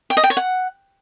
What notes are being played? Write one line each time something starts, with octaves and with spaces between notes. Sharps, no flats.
G5
D#5
G5
C#5
F#5